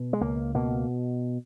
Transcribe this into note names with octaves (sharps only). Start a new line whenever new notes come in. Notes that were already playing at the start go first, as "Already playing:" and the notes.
Already playing: B2
G#3
C#2 A#3
B2 A#3